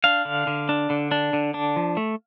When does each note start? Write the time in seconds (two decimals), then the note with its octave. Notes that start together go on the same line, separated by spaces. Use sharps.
0.04 D4 F5
0.25 D3
0.47 D3
0.69 D4
0.90 D3
1.11 D4
1.33 D3
1.54 D4
1.76 F3
1.97 A3